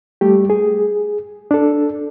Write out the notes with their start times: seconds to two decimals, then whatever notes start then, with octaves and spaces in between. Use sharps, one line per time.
0.21 G3 A3 G4
0.50 G#4
1.51 D4 A4